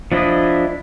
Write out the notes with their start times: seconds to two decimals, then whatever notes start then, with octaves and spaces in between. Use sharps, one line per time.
0.12 F3 D4 E4 D#5